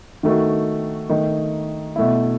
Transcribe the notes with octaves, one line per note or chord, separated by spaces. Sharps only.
D#3 A3 D#4 F#4
D#3 A3 D#4
B2 A3 E4